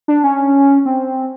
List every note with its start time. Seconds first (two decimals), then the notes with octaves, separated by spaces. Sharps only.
0.08 D4
0.24 C#4
0.86 C4